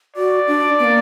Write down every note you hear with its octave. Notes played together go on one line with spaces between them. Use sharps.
F#4 D5
D4
B3
A#3